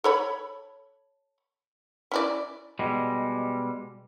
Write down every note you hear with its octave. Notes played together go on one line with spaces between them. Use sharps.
A4 C#5 B5
C#4 E4 D5
B2 G3 G#3